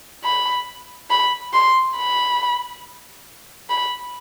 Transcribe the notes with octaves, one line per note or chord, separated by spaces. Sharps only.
B5
B5
C6
B5
B5